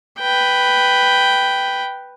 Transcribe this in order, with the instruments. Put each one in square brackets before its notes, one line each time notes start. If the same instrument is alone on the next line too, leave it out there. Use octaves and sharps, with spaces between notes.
[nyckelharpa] B4 G5